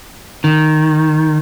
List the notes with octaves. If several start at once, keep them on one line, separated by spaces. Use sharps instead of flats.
D#3